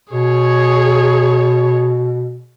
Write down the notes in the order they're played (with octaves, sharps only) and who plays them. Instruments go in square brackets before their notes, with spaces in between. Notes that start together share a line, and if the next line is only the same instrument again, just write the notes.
[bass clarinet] B2 [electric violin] G#4 C#5